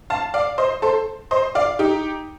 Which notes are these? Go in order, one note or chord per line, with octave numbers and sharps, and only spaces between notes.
F5 A5
D5 F5
C5 D#5
A4 C5
C5 D#5
D5 F5
D#4 G4